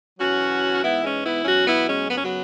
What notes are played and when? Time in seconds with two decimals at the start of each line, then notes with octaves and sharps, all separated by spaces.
0.18 E2 B2 F#3 C#4 F#4
0.82 G#2 E3 B3 E4
1.03 G#3 C#4
1.24 B3 E4
1.44 E2 B2 F#3 C#4 F#4
1.66 B3 E4
1.86 G#3 C#4
2.08 F#2 C#3 F#3 B3
2.16 C#4
2.23 F#3 B3